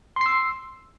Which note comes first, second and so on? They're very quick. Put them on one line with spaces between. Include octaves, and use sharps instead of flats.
C6 C7 E6